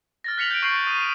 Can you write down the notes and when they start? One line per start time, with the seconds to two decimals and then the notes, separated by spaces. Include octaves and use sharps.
0.24 F6 A6 A#6
0.38 F#6 B6 C#7 F7 F#7
0.50 G6 D7
0.62 C#6 G6 C7 D7 F#7
0.86 C#6 D#6 C7 D#7
0.98 C7